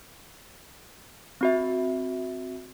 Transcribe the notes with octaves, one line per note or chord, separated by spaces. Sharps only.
C4 F#4 E5